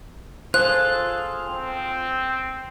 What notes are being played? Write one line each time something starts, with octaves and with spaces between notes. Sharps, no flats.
F4 G#4 A4 C5 F#6
C4